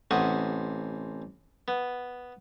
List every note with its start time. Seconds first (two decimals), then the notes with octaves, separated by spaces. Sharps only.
0.11 A1 C3 F#5 C#6 D#6
1.68 B3